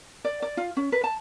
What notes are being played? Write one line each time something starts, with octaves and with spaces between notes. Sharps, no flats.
D5
D5
F4
C#4
B4
A5